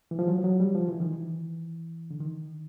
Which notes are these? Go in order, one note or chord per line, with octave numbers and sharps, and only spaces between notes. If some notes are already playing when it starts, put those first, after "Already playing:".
E3
F3
F#3
F3
F#3
G3
F3
E3
D#3
E3
D3
D#3